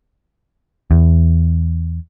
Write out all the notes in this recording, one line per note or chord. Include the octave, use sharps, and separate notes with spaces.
E2